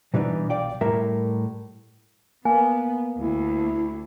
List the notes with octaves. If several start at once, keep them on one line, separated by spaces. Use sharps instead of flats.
B2 E3 G3 B3 D4 D#4
B1 D5 F5 G5
A2 G3 G4 A#4 E5
A#3 B3 G#5
D2 E4